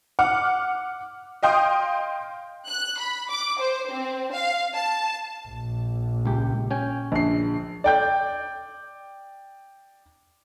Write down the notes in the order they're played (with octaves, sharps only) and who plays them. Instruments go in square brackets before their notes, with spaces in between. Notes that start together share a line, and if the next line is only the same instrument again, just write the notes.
[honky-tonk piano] F#5 D6 F6
D#5 F5 G5 C6 D#6
[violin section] F#6
B5
D6
C5
C4
F5
A5
[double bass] A#1
[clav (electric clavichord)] C#2 G4
C#4 G5 G#5
[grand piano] A#1 C7
[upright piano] D5 G5 G6